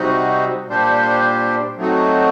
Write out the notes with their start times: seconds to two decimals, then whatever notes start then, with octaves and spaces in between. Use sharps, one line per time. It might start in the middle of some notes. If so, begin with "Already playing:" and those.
Already playing: C3 G3 C4 D#4 F#4
0.68 A#2 G3 D4 G4 C5
1.77 F#3 A3 C4 D#4 F#4